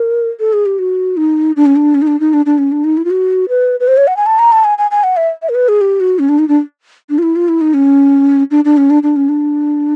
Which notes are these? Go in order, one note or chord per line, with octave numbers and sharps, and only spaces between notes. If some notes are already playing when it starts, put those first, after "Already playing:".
Already playing: A#4
A4
G#4
G4
F#4
D#4
D4
C#4
D4
C#4
D#4
D4
D#4
D4
D4
C#4
D4
D#4
E4
F4
F#4
B4
B4
C5
C#5
F#5
G#5
A5
A#5
A5
G#5
G#5
G#5
F#5
E5
E5
A#4
B4
G#4
G4
F#4
C#4
D4
D#4
D4
D4
F4
E4
F4
E4
D#4
C#4
D4
D4
C#4
D4
D4
C#4
D4